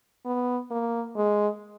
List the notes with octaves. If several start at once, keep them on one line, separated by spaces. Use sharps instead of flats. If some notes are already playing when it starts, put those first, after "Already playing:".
B3
A#3
G#3